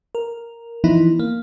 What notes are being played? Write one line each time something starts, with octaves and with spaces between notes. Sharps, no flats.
A#4
E3 F3 B3 D#4 E4
A#3